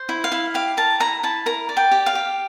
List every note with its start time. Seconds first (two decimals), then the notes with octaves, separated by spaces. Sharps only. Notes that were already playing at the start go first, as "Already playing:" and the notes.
Already playing: C5
0.09 E4
0.24 F5
0.32 E4
0.54 G4 F5
0.77 A#4 A5
1.00 E4 A#5
1.23 E4 A5
1.46 A#4 A#5
1.69 D5
1.77 G5
1.91 G4
2.06 F5
2.15 G4